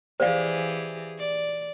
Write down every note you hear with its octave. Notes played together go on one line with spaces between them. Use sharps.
E3 G4 G#4 C5 D5 F5
D5